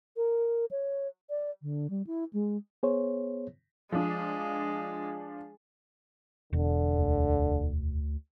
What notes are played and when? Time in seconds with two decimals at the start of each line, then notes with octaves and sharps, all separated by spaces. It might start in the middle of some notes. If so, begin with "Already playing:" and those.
0.17 A#4
0.71 C#5
1.30 D5
1.62 D3
1.90 G3
2.07 E4
2.33 G#3
2.83 B3 G#4 C5 C#5
3.92 F3 G#3 D4
6.53 E1 D3
6.98 D2